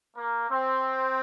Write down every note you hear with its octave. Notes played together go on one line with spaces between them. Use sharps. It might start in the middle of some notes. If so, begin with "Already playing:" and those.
A#3
C4